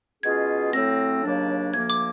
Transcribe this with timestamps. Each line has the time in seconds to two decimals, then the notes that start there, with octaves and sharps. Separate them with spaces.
0.23 B2 G#3 C#4 F4 G#4 G#6
0.73 A2 F#3 A3 C4 A#6
1.23 D#2 C#3 F#3 A#3 D4
1.73 D2 D3 F3 A#3 G#6
1.90 D6